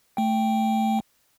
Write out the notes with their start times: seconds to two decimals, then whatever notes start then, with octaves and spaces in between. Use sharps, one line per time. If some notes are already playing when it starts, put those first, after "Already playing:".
0.17 A3 G5